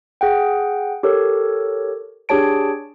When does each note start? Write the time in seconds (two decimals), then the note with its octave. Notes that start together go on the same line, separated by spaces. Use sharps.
0.21 G#4 F#5 G5
1.03 G4 A4 A#4 C#5
2.29 D4 G4 G#4 C#5 A5 D7